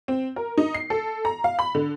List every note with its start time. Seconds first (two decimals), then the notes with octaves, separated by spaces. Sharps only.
0.08 C4
0.36 A#4
0.58 D#4
0.74 C7
0.90 A4
1.25 A#5
1.44 F5
1.59 B5
1.75 D3